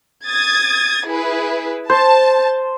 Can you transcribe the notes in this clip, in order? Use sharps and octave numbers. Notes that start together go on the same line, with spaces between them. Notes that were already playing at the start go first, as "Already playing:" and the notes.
D#6 G#6 A6
E4 G#4 B4
C5 A5